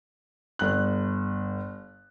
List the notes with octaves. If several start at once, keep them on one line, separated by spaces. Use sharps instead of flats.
G1 F#6